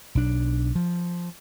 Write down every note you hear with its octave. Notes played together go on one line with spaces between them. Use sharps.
B1 D4
F3